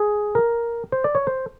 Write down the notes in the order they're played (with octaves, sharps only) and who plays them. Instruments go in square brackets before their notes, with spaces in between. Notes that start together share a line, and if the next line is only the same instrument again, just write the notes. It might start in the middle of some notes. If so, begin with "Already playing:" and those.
Already playing: [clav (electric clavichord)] G#4
A#4
C5
D5
C#5
C5